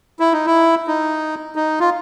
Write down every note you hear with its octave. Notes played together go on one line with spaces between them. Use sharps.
E4
D#4
E4
D#4
D#4
F4